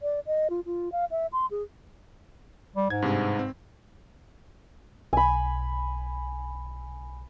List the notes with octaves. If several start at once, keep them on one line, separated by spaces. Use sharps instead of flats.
D5
D#5
F4
F4
F5
E5
C6
G#4
G3
G#2 G#6
G2 C3 G#3
C4
B1 G#5 B5